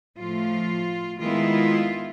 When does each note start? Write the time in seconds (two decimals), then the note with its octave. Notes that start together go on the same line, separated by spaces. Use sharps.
0.17 A2 F3 A3 F4
1.20 D#3 G#3 B3 E4 F4